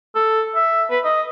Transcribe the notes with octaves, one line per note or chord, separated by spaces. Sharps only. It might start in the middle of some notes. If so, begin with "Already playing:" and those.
A4
E5
B4
D#5